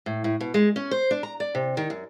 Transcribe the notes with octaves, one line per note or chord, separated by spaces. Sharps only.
A2
A2
B2
G#3
C#4
C5
D4
A#5
D5
C3
D#3
F#2